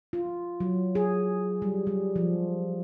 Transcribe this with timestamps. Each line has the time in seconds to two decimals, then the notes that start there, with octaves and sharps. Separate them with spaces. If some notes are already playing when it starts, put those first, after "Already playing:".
0.13 F4
0.60 F#3
0.95 G#4
1.62 G3
1.87 G3
2.16 F3